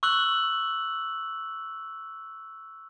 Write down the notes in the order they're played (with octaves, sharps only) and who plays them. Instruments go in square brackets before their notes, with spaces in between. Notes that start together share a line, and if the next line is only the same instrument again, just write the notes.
[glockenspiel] C#6 E6 F#6 F#7